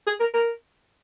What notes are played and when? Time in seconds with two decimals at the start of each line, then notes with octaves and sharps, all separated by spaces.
0.07 G#4
0.20 A#4
0.34 A#4